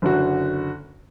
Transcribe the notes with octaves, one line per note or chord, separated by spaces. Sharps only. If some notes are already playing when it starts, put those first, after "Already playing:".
F#1 D3 F#4